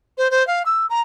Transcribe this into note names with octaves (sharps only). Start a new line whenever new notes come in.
C5
C5
F5
E6
A#5